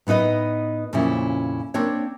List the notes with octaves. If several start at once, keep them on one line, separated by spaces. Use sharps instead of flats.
A2 B3 D#4 B4 D#5
F2 A#2 C#3 C#4 E4
A#3 C4 D4 C#5